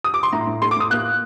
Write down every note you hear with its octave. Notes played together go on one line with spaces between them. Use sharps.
D#6
D6
C6
A2 A#5
A2
A3 C6
D6
A2 D#6
A#3 F#6